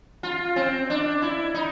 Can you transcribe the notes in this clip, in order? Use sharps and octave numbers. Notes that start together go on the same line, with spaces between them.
F4
C4
D4
E4
D#4